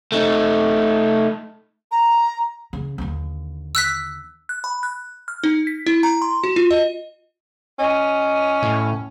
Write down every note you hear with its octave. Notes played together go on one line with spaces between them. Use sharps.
A3 D#4
A#5
C#3
D#2 D3
E6 F#6 B6
F#6
B5
F#6
F6
D#4
B6
E4
A#5
C6
F#4
F4
D#5
C#4 D#5
A2